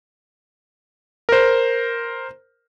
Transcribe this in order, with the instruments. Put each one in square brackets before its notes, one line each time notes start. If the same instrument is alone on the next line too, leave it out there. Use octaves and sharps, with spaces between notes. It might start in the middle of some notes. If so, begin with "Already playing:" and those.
[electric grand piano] A#4 C5